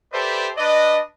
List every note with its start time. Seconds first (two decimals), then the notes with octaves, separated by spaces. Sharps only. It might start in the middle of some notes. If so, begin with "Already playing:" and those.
0.13 G4 A4 B4 C5 D5 E5
0.58 D4 B4 D5 D#5